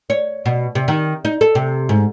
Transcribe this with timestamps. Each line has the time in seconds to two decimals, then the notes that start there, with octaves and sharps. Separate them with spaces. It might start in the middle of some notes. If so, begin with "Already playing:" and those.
0.10 C#5
0.46 B2
0.75 C3
0.88 D#3
1.25 D#4
1.41 A4
1.55 C3
1.89 G#2